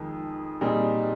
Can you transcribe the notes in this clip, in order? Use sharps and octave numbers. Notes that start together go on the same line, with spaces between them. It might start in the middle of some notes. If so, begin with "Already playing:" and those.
Already playing: F2 D#3 G#3
A#2 G3 C4 D#4 G#4